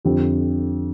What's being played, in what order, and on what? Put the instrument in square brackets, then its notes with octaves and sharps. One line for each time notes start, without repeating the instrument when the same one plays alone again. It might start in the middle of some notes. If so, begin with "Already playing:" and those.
[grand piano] F2 D3 F3 C4 G4